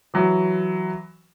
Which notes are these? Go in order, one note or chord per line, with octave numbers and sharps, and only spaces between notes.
E3 F#3